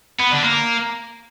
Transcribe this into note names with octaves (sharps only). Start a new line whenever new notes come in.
B3
D3
A#3